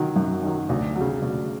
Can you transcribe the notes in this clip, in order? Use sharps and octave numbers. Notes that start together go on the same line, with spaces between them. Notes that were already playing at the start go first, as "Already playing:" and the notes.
Already playing: D#3 F#3
F#2
D#3 F#3
D2
F#3
C#3
D2